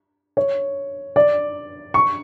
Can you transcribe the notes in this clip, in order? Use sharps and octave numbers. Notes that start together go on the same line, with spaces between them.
C#5
D5
C#6